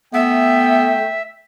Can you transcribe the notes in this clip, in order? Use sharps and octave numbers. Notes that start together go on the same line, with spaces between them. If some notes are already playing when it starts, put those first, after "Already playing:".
A3 B3 E5 G5